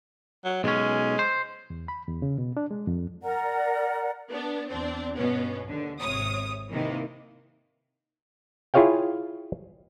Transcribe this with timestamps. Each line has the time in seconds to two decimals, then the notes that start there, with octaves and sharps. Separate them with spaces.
0.45 F#3
0.64 B1 G#3 C#4
1.19 C5
1.70 E2
1.88 B5
2.07 E2
2.22 C#3
2.38 B2
2.57 D4
2.71 G#3
2.87 F2
3.23 A#4 D5 F#5 A#5
4.30 B3 D4
4.69 E2 C4 D4
5.16 G2 B2 B3 C#4
5.65 D#2 D3
6.00 G#1 C3 C#5 D#6
6.72 C3 D#3 E3 A#3
8.74 E4 F4 G#4 C#5 F5 G5